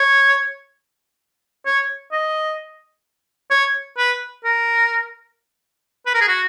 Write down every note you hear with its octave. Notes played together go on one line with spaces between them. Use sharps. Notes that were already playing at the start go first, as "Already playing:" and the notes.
Already playing: C#5
C#5
D#5
C#5
B4
A#4
B4
A#4
G#4
F#4